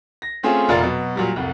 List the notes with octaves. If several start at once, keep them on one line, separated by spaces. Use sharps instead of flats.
A#6
A3 C4 C#4 F4 G#4
F1 A#2 F4 A#4 D5 A6
B2 F#3
A#2 F#3 G3
F1 C2